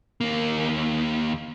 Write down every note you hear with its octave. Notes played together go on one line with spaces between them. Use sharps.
D#2 A#3